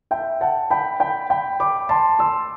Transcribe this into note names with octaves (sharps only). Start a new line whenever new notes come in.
E5 G5
F#5 A5
G5 B5
G5 B5
G5 B5
B5 D6
A5 C6
C6 E6